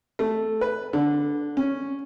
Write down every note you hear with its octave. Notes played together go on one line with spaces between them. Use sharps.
A3
B4
D3
C#4